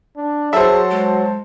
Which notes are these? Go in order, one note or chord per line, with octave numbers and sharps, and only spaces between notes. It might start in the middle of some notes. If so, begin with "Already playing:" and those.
D4
F#3 G#4 A4 C5 E5
G#3